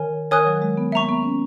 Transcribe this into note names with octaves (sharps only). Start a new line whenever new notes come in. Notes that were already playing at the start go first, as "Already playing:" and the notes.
Already playing: D#3 A#4 C#5 G#5
D#3 A#4 C#5 G#5 D#6 F#6
F#3
G#3
B3
A#3 E5 A#5 C#6
B3
C#4